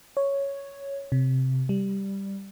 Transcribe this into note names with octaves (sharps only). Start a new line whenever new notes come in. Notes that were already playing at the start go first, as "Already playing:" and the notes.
C#5
C3
G3